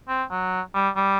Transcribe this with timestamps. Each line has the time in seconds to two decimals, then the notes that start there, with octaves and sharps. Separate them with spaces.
0.08 C4
0.31 F#3
0.74 G3
0.96 G3